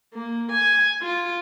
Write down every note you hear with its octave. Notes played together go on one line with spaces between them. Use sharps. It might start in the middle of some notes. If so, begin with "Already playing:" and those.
A#3
G#5
F4